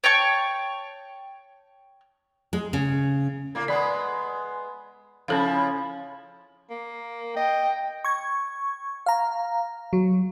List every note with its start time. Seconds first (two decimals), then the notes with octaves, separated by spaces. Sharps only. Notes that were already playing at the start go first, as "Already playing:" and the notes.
0.04 C#5 G5 A5 C#6
2.53 G#3
2.73 C#3
3.55 A2 A#3
3.68 G#3 B3 B4 D5
5.28 C#3 F3 C#4 E4 A4 F5
6.70 A#3
7.36 D#5 G5
8.04 C#6 G#6
9.06 F5 A#5
9.93 F#3